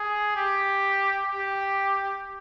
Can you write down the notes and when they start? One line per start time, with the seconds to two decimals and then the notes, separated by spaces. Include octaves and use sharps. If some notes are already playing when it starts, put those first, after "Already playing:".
Already playing: G#4
0.36 G4
1.27 G4